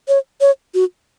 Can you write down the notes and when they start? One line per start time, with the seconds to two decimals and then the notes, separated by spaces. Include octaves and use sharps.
0.08 C#5
0.41 C#5
0.74 F#4